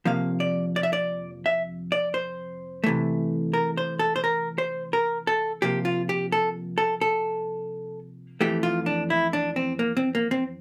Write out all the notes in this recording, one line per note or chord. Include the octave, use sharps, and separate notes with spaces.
F2 C3 F3 A#3 F5
D5
D5
E5
D5
E5
D5
C5
C3 E3 A3
A#4
C5
A4
C5
A#4
C5
A#4
A4
C3 F3 A#3 G4
F4
G4
A4
A4
A4
F2 E3 A3 G4
F4
D4
E4
D4
C4
A#3
C4
A#3
C4